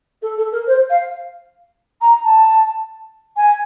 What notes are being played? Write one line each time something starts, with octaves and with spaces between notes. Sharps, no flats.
A4
A4
A#4
C5
F5
A#5
A5
G#5